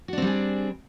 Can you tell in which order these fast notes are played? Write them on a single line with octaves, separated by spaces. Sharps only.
F#4 D4 C4 G3 G#4